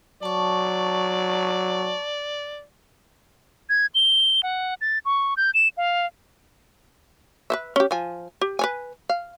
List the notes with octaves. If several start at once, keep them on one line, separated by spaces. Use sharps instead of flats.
F#3 D5 A5 C#6
G#6
G7
F#5
A6
C#6
G6
E7
F5
B4 C5 E5
C#4 G4
F3 G#5
G4
B4 C#5 G#5
F5